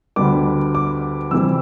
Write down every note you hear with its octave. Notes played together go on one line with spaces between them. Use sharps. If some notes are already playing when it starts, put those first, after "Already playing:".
D2 D3 G3 B3 D6
D6
F2 C3 E3 G3 E6